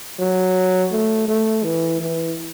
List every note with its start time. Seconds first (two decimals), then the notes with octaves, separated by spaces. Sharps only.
0.19 F#3
0.92 A3
1.28 A3
1.64 E3
2.00 E3